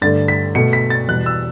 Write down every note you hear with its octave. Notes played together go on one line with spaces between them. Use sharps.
G2 D3 A3 A6
B6
B2 A3 C#7
B6
A6
E2 B2 G3 F#6
E6